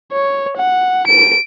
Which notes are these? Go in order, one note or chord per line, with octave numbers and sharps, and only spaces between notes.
C#5
F#5
D7